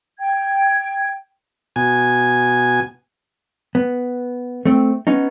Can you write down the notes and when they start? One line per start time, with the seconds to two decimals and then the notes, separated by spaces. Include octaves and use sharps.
0.19 G5 G#6
1.76 B2 G#5
3.75 B3
4.65 A3 C4
5.07 B3 C#4 D#4